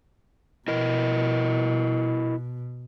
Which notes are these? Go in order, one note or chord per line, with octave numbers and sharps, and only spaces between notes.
B2 E4 A#4 D#5